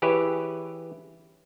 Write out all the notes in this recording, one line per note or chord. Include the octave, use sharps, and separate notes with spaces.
E3 G4 G#4 B4 C#5 E5